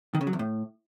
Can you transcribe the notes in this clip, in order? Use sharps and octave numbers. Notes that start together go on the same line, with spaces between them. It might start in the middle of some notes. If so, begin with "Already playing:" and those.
D#3
C#3
F#3
E2
A2